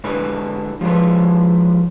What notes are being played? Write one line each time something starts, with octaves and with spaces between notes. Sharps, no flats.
G#2 D3 E4 B4
F3 G#3 E4 B4